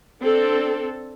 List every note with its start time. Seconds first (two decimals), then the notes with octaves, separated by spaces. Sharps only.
0.23 C4 D4 A4